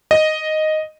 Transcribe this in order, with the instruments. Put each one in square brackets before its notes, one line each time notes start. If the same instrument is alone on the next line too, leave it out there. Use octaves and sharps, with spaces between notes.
[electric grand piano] D#5